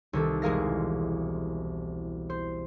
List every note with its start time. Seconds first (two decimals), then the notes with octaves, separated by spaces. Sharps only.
0.13 C2 D#3 A4
0.42 E1 G#3 G#4 A#4 F5 A#6
2.30 C5